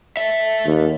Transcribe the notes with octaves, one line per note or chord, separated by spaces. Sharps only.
A4 E5
D#2